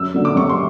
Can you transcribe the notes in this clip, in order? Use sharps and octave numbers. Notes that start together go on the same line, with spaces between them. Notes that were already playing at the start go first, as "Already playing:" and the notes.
Already playing: F#2 E6
D3 F#3 A#3
D6
F#2 C#6
C6